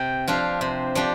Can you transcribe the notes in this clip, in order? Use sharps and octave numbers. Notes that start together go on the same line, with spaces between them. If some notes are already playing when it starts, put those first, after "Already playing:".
Already playing: C3 G5
F3 D4 G4 F5
C3 C5
F3 D4 G4